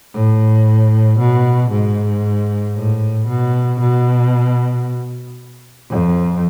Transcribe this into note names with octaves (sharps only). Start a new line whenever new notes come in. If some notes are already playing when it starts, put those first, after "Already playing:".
A2
B2
G#2
A2
B2
B2
F2